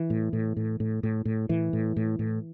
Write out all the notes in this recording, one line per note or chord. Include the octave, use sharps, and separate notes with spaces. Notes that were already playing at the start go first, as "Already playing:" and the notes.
Already playing: E3
A2
A2
A2
A2
A2
A2
A2 E3
A2
A2
A2